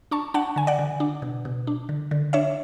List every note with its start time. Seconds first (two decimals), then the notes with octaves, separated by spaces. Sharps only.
0.11 D4 A5 C#6
0.34 D4 F#5 A5
0.56 D3 G#5
0.67 D5 F#5
0.79 D3
1.00 D4
1.22 B2
1.45 B2
1.67 D4
1.89 D3
2.11 D3
2.33 D4 C#5 E5